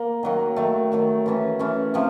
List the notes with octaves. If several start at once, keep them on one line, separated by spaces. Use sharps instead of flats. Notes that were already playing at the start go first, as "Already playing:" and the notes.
Already playing: A#3
D#3 F#3 A#3
D#3 F#3 A3
D#3 F#3 A3
E3 A3 C#4
E3 A3 C#4
C3 F3